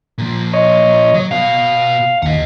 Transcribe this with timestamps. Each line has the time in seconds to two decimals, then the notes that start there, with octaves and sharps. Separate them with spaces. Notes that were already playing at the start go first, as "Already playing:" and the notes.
0.18 A#2 F3
0.53 C#5 D#5
1.14 F#3
1.31 B2 F#4 F5
2.22 D#2 D#5 F#5